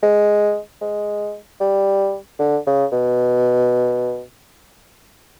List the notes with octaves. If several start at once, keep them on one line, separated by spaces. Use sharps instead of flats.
G#3
G#3
G3
D3
C#3
B2